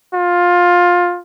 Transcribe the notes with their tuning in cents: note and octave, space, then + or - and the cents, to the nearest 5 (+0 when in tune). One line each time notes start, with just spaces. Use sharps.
F4 +15